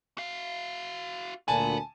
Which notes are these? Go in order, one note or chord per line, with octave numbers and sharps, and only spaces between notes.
F#4 F5
D2 A#2 B3 G#5 A5